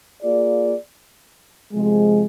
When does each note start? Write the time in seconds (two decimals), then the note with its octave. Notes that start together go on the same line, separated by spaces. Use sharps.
0.22 A#3 F4 G#4 D5
1.73 C3 F3 G#3